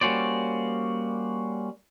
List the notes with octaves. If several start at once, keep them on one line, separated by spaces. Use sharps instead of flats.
G3 A#3 C#4 F#4 C5 D5